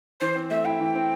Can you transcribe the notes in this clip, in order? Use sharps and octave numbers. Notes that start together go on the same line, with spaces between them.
E3 C5
C4
A3 E5
E4 G5
E3
C4